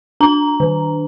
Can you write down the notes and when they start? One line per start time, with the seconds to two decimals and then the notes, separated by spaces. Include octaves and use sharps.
0.21 D4 A#5
0.60 D#3